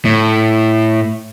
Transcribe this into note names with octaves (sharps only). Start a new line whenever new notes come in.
A2